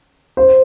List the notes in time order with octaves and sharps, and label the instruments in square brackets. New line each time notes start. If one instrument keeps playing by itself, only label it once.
[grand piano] C5